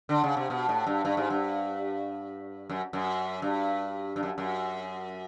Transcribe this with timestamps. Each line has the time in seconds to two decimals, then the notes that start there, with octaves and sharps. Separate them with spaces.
0.09 D3
0.24 C#3
0.37 C3
0.50 B2
0.69 A2
0.87 G2
1.05 G2
1.17 G#2
1.30 G2
2.70 F#2
2.93 F#2
3.42 G2
4.16 G2
4.23 F#2
4.38 F#2